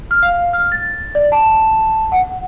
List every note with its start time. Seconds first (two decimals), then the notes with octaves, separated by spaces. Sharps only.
0.11 F6
0.23 F5
0.53 F6
0.72 A6
1.15 D5
1.32 A5
2.12 F#5